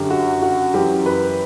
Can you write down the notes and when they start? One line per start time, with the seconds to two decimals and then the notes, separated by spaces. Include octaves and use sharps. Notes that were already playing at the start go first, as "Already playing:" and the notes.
Already playing: F#2 D3 G4
0.10 F#4
0.42 F#4
0.74 F#2 E3 G4
1.06 B4